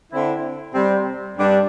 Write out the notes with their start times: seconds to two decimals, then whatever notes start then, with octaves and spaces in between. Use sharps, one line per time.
0.11 D3 C4 E4
0.73 C3 G3 C4
1.35 G2 G3 D4